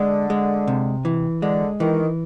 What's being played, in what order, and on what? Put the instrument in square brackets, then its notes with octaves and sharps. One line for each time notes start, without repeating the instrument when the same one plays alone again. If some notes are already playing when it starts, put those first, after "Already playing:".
Already playing: [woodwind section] D3 [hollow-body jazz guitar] G#3
[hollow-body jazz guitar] G#3
C3
E3
[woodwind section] D3 [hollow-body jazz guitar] G#3
[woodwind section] D#3 [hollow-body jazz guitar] E3